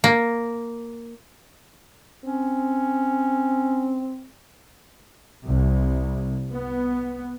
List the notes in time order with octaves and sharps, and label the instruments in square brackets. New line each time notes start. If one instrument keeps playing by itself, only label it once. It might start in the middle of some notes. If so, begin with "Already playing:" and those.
[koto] A#3
[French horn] C4 [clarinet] C#4
[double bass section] C2
B3